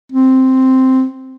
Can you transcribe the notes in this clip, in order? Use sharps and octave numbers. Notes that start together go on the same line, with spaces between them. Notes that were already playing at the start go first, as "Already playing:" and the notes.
C4